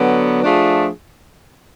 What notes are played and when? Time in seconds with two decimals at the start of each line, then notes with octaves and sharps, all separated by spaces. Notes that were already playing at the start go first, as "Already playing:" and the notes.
Already playing: D3 F#3 B3
0.42 F3 A3 D4 F4 G#4